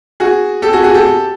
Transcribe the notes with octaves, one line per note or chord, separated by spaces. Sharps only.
F#4 G#4
G4 A4
F#4 G#4
F#4 G#4
G4 A4